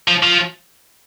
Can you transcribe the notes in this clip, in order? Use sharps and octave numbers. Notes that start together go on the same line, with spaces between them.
F3
F3